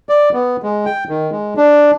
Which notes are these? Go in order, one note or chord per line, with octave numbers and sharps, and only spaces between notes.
D5
B3
G#3
G5
D#3
G#3
D4